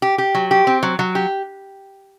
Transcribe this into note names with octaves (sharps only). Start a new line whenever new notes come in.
G4
G4
F#3
G4
C4
F#3
F#3
G4